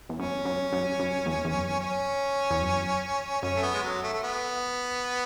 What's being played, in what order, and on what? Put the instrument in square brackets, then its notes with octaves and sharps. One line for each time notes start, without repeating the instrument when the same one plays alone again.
[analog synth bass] E2
[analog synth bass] F#2 [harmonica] C#4
[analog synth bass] F#2
F#2
F#2
E2
E2
F#2
[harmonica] C#4
[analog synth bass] E2
F#2
[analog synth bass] F#2 [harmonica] C#4
[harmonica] A3
B3
G#3
F#3
A3
A3
B3